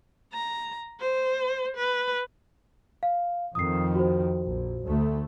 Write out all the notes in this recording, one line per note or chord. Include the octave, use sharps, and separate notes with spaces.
A#5
C5
B4
F5
F2 D#3 D#6 C7
F#4 C5
A#1
D2 A3